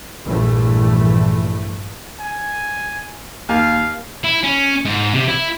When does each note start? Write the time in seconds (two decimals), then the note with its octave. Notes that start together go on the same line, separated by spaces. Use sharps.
0.24 A#1 G2 E3 A3
2.20 G#5
3.49 D#2 F5
4.24 E4
4.43 C#4
4.85 G#2
5.14 C3
5.28 E4